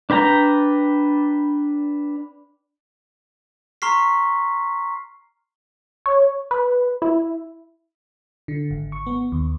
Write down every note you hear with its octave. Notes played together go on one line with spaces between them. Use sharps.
D4 B4 G5 A#5
A#5 C6 C#6 F6 B6 C7
C#5
B4
E4
D3
G#1
C#6
B3
D#2